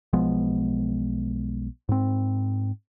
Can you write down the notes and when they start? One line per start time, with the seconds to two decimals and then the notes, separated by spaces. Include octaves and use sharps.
0.13 B1 F3 G#3 B3
1.89 G#2 C4